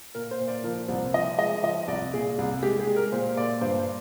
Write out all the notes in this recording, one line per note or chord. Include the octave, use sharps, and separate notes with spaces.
A#2 A#4
C5
A#2
D5
F3 A#4
C2 C5
F3 D#5
G#3 D#5
F3 D#5
C2 D5
A#2 G#4
C2
G#3 G4
G#4
G#3
A#4
A#2 C5
A#2 D5
G2 C5